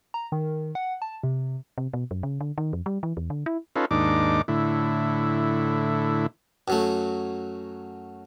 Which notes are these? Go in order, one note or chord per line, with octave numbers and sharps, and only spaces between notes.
A#5
D#3
F#5
A5
C3
C3
B2
F#2
C#3
D3
D#3
F2
G3
E3
E2
D3
E4
C#4 D#4 F4 A4 B4
D#2 G#2 D4 D#4 D6
A2 D3 E4
F#2 F#3 A3